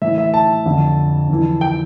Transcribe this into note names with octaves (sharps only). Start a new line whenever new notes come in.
A2 E3 E5
E5
A5
F2 D3
F2 E3
G5